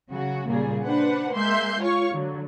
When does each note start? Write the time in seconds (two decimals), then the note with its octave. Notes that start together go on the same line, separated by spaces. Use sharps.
0.10 C#3 F#3 F#4
0.47 A#2 C#3 G3 A#3 G#4
0.85 D4 B4 C5 F#5
1.33 G#3 A#3 E5 C6 G6
1.80 F4 C#5 F5 C#6
2.12 D3 F#3